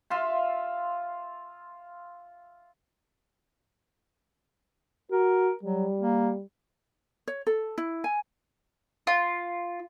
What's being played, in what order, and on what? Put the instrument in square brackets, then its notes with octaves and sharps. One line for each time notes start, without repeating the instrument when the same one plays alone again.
[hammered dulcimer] F4 E5 F5 C6
[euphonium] F#4 [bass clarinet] A#4
[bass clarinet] F#3 [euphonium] G3
[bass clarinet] A#3
[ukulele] C#5
A4
E4
G#5
[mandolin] F4